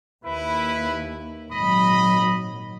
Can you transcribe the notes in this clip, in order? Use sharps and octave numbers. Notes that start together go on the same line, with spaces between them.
D#2 E4 B4
G#1 A#2 F#3 D#5 B5